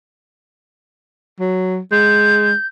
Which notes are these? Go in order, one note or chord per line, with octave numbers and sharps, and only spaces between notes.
F#3
G#3 G6